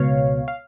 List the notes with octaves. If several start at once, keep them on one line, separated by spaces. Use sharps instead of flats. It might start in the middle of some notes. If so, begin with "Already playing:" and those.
Already playing: C#2 B2 C#5 F5
F5